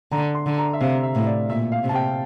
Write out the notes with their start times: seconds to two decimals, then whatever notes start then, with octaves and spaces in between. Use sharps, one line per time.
0.12 D3 A#5
0.35 C6
0.46 D3
0.58 A#5
0.73 E5
0.81 C3 F5
1.03 E5
1.15 A2
1.26 D5
1.50 A#2 E5
1.72 F5
1.83 C3
1.89 A5
1.95 G5